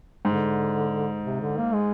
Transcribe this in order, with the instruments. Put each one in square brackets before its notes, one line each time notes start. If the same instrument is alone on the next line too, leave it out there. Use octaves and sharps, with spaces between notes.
[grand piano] G#2 [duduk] D3
[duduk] C3
D3
A#3
G#3